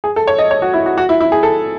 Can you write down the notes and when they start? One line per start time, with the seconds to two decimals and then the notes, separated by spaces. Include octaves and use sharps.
0.04 G#4
0.16 A4
0.27 C#5
0.38 D#5
0.51 C#5
0.62 F#4
0.73 E4
0.86 F#4
0.98 F#4
1.09 E4
1.20 E4
1.32 G#4
1.43 A4